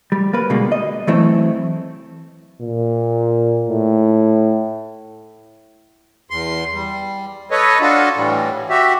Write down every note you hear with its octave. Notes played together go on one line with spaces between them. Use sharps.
G3
A#3 B4
B2 D3 G3 G#3 A#3
D#5
E3 F#3 A3 C4 E4 A4
A#2
A2
E2 C6
G3
A4 B4 C#5 D#5
D4 F4 F#4 A4
A2 E3 G3
F#4 G4 E5